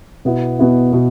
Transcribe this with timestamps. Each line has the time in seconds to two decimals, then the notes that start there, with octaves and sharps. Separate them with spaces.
0.25 B2 B3 E4
0.59 B2 B3 E4
0.92 B2 B3 E4